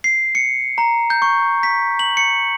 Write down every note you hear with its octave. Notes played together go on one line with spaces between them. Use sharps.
C7
C#7
A#5
G6
C#6
B6
F#7
C#7